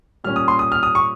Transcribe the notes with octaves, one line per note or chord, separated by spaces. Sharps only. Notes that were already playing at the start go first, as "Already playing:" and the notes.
A#2 G3 C#4 F6
D#6
C6
D#6
F6
D#6
C#6